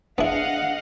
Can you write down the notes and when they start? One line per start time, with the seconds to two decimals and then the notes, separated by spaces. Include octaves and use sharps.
0.18 B3 D4 E4 G#4 D#5 F5 F#5